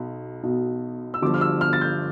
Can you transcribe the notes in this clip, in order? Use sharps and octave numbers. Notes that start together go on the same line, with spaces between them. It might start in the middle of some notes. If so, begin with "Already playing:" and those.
Already playing: B1 B2
B1 B2
E6
G1 G2 F3 D6
F6
E6
F6
A6
G6